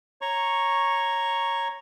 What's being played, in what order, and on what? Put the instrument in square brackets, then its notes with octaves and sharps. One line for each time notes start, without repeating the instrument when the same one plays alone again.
[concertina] C#5 A#5 C#6